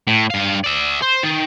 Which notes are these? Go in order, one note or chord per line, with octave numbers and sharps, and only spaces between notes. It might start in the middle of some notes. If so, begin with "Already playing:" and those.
A2
G2 F5
D5 E5
C5
D#3